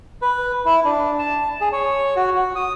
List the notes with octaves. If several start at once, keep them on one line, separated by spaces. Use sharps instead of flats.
B4
E4
D4
A5
G#4
C#5
F#4
F#4
D#6